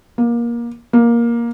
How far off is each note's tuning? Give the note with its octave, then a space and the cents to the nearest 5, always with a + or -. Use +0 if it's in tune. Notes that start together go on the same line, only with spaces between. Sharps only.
A#3 +20
A#3 +10